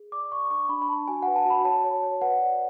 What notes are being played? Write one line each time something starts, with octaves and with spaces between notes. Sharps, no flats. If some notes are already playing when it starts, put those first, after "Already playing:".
Already playing: G#4
D5 D6
D5 C#6
D4 C#6
D4 B5
B5
D4 A5
F#4 G#5
F#5
B4
A5
F#4 B5
C#5 A5
C#5
C#5
B4 F#5
D5